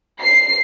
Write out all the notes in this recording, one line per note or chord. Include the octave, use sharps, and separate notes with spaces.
C7